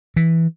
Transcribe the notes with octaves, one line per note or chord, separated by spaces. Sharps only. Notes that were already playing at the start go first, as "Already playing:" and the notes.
E3